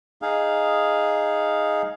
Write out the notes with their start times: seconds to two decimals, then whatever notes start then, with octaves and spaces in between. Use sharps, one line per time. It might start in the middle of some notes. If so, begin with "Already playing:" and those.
0.22 D#4 G#4 F5